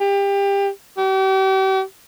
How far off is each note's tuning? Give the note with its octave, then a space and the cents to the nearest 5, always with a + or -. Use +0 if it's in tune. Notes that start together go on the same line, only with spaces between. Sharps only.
G4 +25
G4 -40